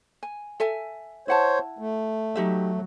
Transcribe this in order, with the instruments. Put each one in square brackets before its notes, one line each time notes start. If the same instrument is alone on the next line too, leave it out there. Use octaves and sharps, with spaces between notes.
[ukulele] G#5
A4 E5 G#5
[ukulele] E4 F#5 A5 [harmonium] C5 C#5
[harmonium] A3
[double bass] F#3 [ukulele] D#4 G4 E5